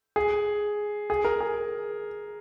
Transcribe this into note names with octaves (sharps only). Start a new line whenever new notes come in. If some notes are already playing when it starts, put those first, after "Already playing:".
G#4
G#4
A#4
G#4